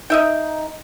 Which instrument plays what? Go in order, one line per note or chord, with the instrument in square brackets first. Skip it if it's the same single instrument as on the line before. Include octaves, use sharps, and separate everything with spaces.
[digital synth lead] D#4 [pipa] D#5 E5 G5